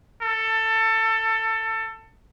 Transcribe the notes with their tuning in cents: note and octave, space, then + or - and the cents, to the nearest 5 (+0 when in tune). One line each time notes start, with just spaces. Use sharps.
A4 +20